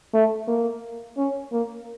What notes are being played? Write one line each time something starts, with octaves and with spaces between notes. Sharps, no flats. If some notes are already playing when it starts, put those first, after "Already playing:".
A3
A#3
C#4
A#3